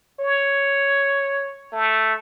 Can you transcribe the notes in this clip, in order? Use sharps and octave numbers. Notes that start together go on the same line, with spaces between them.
C#5
A3